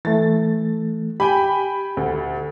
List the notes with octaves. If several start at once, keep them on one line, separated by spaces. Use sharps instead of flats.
E3 A3 A6
G4 G5 G#5 B5
D2